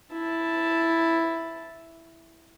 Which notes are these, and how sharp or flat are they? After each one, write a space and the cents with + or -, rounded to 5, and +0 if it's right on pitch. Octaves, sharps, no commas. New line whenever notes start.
E4 +0 A5 +0